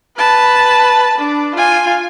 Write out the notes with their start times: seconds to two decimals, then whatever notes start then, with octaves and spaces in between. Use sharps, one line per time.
0.17 B4 A5
1.18 D4
1.56 F4 G#5